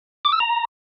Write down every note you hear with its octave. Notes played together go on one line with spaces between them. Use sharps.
D6
E6
A#5